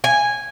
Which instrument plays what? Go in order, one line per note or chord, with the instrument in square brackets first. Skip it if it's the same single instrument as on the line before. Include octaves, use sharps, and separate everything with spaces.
[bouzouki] G#5